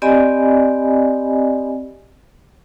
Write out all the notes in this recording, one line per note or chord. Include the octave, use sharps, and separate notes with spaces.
C4 G4 D5 D#5 G#5 B5